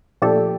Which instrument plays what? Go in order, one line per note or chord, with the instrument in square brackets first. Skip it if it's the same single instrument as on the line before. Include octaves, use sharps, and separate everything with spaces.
[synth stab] A#2 F3 A3 D4 A4 [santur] G4